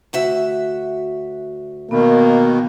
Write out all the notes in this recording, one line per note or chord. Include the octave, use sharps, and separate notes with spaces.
D2 F#4 E5
B2 D#3 A#3 B3 B5